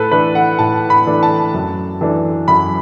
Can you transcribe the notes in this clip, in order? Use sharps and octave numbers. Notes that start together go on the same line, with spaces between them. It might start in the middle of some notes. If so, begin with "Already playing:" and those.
Already playing: A2 A4 B4
E3 A3 D4 B4
F#5
A2 A5
B5
E3 A3 D4
A5
F#2
E3 A3 D4
F#2 B5